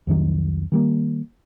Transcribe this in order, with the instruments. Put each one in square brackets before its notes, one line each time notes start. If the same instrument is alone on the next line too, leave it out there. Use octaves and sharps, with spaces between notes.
[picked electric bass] C2 F2 D#3 F#3
D#3 G3 A#3